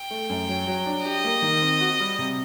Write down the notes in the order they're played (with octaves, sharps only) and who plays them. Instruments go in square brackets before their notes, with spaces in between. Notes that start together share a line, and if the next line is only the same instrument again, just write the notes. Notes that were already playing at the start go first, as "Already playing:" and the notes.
Already playing: [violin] G5
[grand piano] A3
F#2
F#3
F#3
D4
[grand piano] G4 [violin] D#5
[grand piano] A#3
D#3
C4
F#4
G3
C3